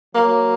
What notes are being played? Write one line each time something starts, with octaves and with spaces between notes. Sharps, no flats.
F#3 A#3